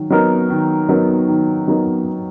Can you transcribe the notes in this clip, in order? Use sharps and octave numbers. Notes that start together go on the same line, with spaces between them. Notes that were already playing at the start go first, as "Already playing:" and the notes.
Already playing: D#3 F#3
F#3 B3 D#4 A#4
D#3
F#3 B3 D#4 A#4
D#3
F#3 B3 D#4 A#4